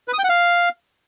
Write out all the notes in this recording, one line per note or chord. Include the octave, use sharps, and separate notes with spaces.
B4
D#6
G5
F#5
F5